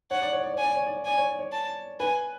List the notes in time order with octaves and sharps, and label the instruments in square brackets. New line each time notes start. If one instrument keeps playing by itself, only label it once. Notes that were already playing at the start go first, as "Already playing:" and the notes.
[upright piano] C#5 [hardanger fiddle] F#5
[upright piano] D5
C#5
D5
[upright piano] C#5 [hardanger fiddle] G#5
[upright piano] D5
C#5
D5
C#5
[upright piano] D5 [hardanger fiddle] G#5
[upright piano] C#5
D5
C#5
[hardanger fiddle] A5
[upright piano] B4 [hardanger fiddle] G#5